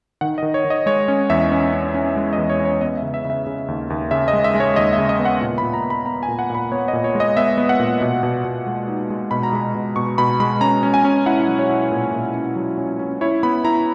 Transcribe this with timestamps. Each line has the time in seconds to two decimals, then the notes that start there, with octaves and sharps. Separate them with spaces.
0.21 D#3 F#5
0.38 D#5
0.42 D#3
0.54 C#5
0.65 D#3
0.70 D#5
0.86 G#3 C#5
1.08 C#4
1.30 E2 E5
1.51 C#4
1.73 C#4
1.94 C#4
2.17 G#3
2.33 D#5
2.38 E2
2.49 C#5
2.60 C#4
2.65 C#5
2.81 B3 D#5
2.97 E5
3.02 C#3
3.14 E5
3.25 C#3 E5
3.47 C#3
3.68 D#2
3.90 D#2
4.11 C#3 E5
4.28 D#5
4.33 G#3
4.44 E5
4.55 G#3
4.60 C#5
4.76 D#2 D#5
4.93 E5
4.98 C#3
5.09 D#5
5.19 B3
5.25 F#5
5.41 A#2
5.58 B5
5.63 A#2
5.73 A#5
5.85 B3
5.90 B5
6.06 B3 A#5
6.23 G#5
6.28 A#2
6.39 F#5
6.50 A#2 B5
6.72 B3 C#5
6.88 D#5
6.93 A#2
7.04 C#5
7.15 G#3
7.20 D#5
7.37 B3 E5
7.58 B3
7.69 F#5
7.80 A#2
8.01 B2
8.23 B2
8.45 B2
8.67 G#3
8.88 D#4
9.10 G#3
9.31 B2 B5
9.43 A#5
9.53 G#3 B5
9.75 B2
9.96 B2 C#6
10.18 B2 B5
10.40 G#3 B5
10.61 C#4 A#5
10.83 C#4
10.94 G#5
11.04 C#4
11.26 E4 F#5
11.48 F#3
11.59 C#5
11.70 E4
11.92 A#2
12.13 A#2
12.34 C#4
12.56 F#3
12.78 C#4
12.99 C#4
13.21 E4 C#5
13.43 B3 B5
13.65 E4 A#5